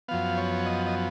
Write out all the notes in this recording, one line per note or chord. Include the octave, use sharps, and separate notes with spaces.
F#2 F3 B3 F5
C#5
D#5
D#5